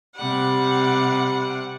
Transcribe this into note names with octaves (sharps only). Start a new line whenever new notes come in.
C3 G3 F#5